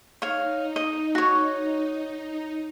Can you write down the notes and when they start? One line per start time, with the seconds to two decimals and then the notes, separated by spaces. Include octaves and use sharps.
0.22 D#4 C#5 F5
0.76 D#5
1.15 F#4 C#5